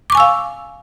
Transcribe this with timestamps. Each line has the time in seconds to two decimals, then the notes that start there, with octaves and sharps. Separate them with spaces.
0.10 D6
0.12 C#6
0.15 G#5
0.17 E6
0.20 F5